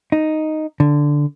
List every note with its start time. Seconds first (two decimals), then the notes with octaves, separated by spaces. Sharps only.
0.12 D#4
0.80 D3